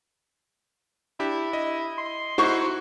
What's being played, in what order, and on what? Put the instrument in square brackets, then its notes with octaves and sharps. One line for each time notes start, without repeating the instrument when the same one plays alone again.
[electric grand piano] D4 G4 [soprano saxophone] E4
[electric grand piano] D#5
[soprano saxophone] C6
[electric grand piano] D#4 E4 C5 [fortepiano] F#4 C#6